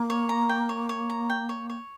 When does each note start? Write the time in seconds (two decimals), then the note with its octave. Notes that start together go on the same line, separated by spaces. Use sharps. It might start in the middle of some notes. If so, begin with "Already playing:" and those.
Already playing: A#3
0.10 C#5
0.29 A#5
0.49 G5
0.69 C#5
0.89 C#5
1.10 A#5
1.30 G5
1.49 C#5
1.70 C#5